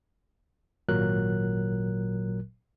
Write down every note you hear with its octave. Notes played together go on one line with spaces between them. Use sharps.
G#1 A#2 F#3 A#4 F#6